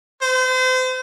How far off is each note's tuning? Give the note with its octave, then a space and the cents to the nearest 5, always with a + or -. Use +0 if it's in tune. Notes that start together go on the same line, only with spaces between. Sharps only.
C5 -35